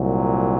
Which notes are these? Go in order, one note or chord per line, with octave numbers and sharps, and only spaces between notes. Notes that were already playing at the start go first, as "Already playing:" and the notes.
Already playing: C2 A#2 F#3